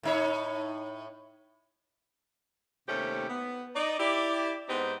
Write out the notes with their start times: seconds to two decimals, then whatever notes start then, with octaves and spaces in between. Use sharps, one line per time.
0.03 A2 D#4 C#5
2.88 D#2 C3 A3 C#4 G4 C5
3.29 B3
3.76 D#4 D5
3.99 E4 G4 D5
4.69 G#2 B3 C4 D#4 G4 C5